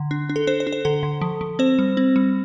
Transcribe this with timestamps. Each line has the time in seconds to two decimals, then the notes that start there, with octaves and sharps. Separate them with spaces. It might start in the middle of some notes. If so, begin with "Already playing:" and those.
Already playing: D3
0.11 D4
0.30 D4
0.36 A4
0.47 D4 C5
0.60 C5
0.67 D4
0.73 C5
0.85 D3 A4
1.03 D3
1.21 F3
1.41 F3
1.59 C4 C5
1.79 G3
1.97 C4
2.16 G3